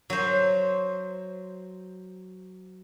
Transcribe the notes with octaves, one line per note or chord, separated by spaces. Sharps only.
F#3 C5